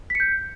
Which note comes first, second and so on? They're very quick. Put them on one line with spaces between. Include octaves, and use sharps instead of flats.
B6 C#7 G6